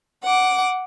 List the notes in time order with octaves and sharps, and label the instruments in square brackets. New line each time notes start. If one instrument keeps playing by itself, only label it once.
[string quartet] F#5 D6